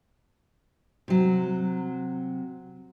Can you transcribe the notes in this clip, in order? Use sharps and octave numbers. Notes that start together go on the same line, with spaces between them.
C3 F#3